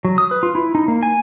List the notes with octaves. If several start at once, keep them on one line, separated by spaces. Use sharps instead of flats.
F#3
D#6
B4
F4
E4
D#4
A#3
G#5